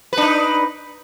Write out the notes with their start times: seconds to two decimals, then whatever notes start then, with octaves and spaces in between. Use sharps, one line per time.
0.13 B4
0.17 D4
0.22 D#4